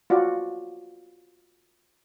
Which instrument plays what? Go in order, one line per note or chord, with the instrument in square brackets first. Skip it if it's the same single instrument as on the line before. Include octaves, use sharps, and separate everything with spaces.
[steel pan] F4 F#4 D5